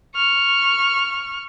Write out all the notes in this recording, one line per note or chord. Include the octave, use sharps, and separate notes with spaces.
C#6 F6